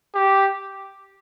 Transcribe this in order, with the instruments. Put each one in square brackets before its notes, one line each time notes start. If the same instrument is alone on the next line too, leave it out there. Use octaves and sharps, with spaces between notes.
[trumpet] G4